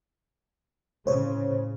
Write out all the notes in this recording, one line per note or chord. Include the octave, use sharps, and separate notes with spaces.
A2 C#3 C5 C#5